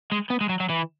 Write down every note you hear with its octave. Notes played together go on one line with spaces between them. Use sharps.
G#3
B3
G#3
F#3
F#3
E3